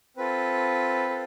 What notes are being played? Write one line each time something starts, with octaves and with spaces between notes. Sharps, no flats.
C4 F4 A4 B4
A4